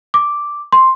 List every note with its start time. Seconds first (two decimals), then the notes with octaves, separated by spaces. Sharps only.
0.14 D6
0.72 C6